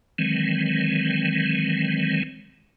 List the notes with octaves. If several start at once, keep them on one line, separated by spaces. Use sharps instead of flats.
D#3 E3 F#3 G#3 C4